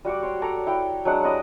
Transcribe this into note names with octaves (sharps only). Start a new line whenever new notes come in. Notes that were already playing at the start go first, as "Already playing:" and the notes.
G3 F#4 F#5 D6
C5 C#5
A4 C#5 D5 A#5
E4 G5
F#3 G#3 D4 F#5
E4 G4 D5 D#5